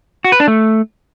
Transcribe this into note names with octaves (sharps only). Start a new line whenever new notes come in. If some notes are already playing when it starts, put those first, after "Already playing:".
F#4
B4
D4
A3